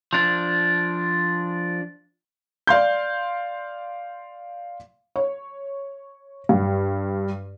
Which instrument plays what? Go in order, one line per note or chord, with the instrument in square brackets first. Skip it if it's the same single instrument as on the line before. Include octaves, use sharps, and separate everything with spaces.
[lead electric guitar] F3 D4
[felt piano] D5 F5 C6 G6
C#5
G2